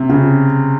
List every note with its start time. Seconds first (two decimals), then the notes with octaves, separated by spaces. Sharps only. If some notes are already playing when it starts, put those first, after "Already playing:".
Already playing: C3
0.09 C#3